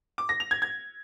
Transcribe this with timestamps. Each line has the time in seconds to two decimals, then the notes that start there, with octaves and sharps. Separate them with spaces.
0.18 D6
0.29 A#6
0.40 F7
0.51 G#6
0.62 G#6